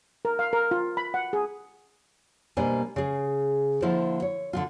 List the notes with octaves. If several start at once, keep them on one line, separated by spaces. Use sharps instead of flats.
A#4
F5
A#4
F4
B5
F#5
G#4
B2 G3 A#3 D4 C5 G#5
C#3 G#4
D3 F3 A#3 E4 F4 C5
C#5
D3 C4 F4